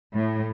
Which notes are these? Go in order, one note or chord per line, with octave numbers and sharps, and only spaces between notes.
A2